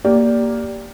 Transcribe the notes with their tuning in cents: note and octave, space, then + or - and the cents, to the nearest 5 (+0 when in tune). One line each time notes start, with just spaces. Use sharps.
A#3 +0 G4 +0 D5 -15